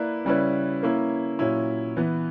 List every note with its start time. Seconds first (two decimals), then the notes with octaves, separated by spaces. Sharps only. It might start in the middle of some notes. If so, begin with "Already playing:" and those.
Already playing: A#3 E4 B4 D5
0.25 C#3 G3 C#4 E4 B4
0.83 A#3 C#4 E4
1.39 A#2 F#3 C#4 E4
1.97 E3 B3 E4